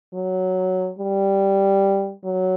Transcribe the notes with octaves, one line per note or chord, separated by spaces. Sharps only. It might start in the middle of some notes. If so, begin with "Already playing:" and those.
F#3
G3
F#3